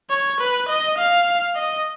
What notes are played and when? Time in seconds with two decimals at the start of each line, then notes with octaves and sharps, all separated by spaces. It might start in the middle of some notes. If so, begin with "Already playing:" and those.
0.10 C#5
0.40 B4
0.69 D#5
0.98 F5
1.56 D#5